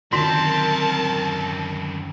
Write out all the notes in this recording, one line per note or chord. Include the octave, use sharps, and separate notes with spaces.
F#2 D3 D#3 C4 A#4 A5 C6 B6